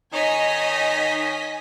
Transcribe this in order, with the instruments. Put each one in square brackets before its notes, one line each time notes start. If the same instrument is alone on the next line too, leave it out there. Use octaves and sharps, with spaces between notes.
[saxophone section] D#3 D#4 [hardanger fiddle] C#5 [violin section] D#5 G#5 B6